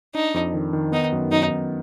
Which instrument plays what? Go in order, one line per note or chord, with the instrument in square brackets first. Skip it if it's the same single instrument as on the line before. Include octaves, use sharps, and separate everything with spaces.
[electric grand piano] D4 [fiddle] D#4
[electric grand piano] F2
D#3
D#3
[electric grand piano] B3 [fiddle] D#4
[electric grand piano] F#2
[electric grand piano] F#2 [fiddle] D#4
[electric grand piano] F#2